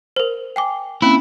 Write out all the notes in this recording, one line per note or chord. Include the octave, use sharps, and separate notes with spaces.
A#4 C5
G5 G#5 D6
A#3 C4 C#4 E4